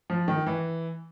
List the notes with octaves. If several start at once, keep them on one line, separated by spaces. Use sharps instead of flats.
F3
D#3
E3